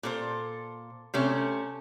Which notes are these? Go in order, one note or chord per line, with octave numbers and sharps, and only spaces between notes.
A#2 A4 C5
C3 A3 C#4